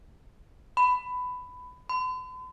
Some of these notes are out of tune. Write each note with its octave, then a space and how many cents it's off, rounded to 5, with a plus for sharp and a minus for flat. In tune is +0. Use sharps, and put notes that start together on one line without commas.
B5 +15
B5 +45